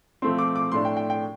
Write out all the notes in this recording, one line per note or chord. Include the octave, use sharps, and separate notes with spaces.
F3 A3 C4 C6
D6
D6
A2 A3 D4 C6
G5
G5
G5